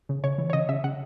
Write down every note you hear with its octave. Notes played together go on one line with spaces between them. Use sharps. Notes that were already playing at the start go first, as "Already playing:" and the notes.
C#3
C#3 C#5
E3
C#5
C#3 D#5
C#3 E5
C#3 F#5